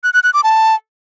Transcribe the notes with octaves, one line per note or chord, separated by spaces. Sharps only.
F#6
F#6
F#6
D6
A5